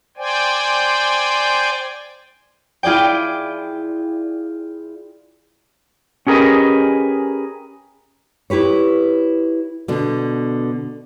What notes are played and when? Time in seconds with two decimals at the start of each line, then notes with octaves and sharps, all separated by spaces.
0.17 C5 D5 G5 G#5
2.83 E4 F4 G#4 D5 G5
6.27 C#4 G4 G#4 A#4 B4 D#5
8.50 E4 G4 B4 C#5
9.88 B2 D3